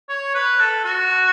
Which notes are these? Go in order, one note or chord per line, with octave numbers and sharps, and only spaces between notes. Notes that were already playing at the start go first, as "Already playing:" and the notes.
C#5
B4
A4
F#4